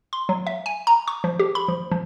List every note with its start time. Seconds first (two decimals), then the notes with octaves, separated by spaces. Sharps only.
0.13 C6
0.29 F#3
0.47 E5
0.66 G#5
0.87 A#5
1.08 C#6
1.24 F3
1.39 G4
1.55 B5
1.68 F3
1.92 F3